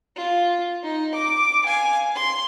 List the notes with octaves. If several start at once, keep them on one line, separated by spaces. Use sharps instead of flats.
F4
D#4
D6
F5 G#5
C6